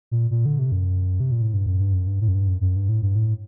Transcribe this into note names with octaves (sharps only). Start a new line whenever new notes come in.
A#2
A#2
D3
C3
F#2
C3
A#2
A2
G2
F#2
G2
F#2
G2
A2
F#2
G2
F#2
F#2
G2
A2
G2
A2